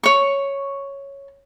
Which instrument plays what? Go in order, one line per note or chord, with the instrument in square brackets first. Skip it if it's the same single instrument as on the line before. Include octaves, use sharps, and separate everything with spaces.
[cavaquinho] C#5 C#6